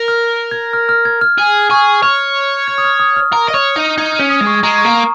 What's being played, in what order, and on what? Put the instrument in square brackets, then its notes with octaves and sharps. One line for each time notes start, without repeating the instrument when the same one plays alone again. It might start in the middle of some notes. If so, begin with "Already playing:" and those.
Already playing: [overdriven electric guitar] A#4
[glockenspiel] F6
G#6
F6
F6
G#6
F6
[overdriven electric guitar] G#4
[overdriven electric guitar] G#4 [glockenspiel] C#6
[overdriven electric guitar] C#5 [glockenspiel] F6
[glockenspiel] G#6
D#6
F6
D#6
F6
[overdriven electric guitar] A#4 [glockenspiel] F6
[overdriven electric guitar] D#5
[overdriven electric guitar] C#5 [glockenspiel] F6
[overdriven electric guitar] D#4 [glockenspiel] F6
[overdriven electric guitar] D#4 [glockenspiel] G#6
[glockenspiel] F6
[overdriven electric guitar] C#4
[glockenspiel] D#6
[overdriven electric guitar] G#3
[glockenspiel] C#6
[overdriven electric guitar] G#3 [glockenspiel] A#5
[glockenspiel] C#6
[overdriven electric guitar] A#3 [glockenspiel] A#5